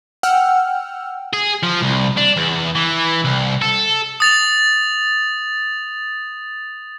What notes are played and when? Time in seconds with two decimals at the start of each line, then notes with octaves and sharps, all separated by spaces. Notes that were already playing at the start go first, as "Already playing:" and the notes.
0.23 F#5 G5 E6 F6
1.33 G#4
1.63 F3
1.82 C2
2.17 D4
2.37 E2
2.75 E3
3.24 C2
3.62 A4
4.20 D#6 A6 F7